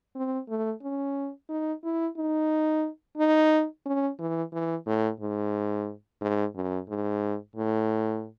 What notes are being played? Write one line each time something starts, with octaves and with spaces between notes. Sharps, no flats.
C4
A3
C#4
D#4
E4
D#4
D#4
C#4
E3
E3
A2
G#2
G#2
F#2
G#2
A2